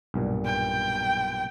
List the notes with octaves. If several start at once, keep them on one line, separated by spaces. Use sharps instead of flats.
B1 G2 A#2
G5